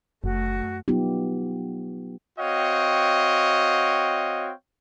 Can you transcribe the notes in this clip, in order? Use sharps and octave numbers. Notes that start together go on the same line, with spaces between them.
F#1 F#2 A3 F#4
F#3 B3 D#4 F4 G4
C4 F#4 C#5 D#5 F5 G5